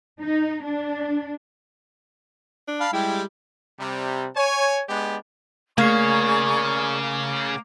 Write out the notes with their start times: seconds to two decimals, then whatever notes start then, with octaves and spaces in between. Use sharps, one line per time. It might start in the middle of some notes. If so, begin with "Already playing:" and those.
0.21 D#4
0.65 D4
2.68 D4
2.80 F5 A5 B5
2.93 G3 G#3 E4 G4
3.78 C3 G3
4.36 C#5 G#5
4.88 G#3 B3 D4 G4
5.78 C#3 A3 A#3 C#4 G#4 D5 C#6 C7